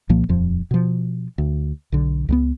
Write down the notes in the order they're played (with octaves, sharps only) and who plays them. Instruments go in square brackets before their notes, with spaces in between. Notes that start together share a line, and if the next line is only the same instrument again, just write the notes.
[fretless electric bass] C2 A#2 F3 A#3
D#1 F2 F3
B2 F3
D2
B1 D3
C#2 G3 B3